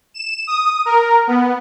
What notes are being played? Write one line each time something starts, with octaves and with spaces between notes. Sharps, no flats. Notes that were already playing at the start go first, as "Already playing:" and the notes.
E7
D#6
A#4
B3